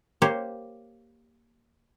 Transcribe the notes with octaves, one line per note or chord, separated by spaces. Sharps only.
A#3 G4 C5 C#5